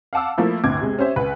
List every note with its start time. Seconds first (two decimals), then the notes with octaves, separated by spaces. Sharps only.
0.13 F5 F#5 A5 D6 E6
0.38 F3 A3 A#3 E4
0.64 G1 D2 A2 D6 G#6
0.81 C3 G#3
0.99 C#4 G4 C5 E5
1.16 C#2 B4